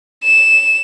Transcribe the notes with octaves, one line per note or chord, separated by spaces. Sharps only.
E7